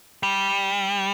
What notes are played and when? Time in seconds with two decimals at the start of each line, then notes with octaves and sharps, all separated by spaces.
0.23 G3